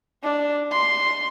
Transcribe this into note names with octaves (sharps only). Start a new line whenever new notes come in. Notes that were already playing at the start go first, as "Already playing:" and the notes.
D4
C6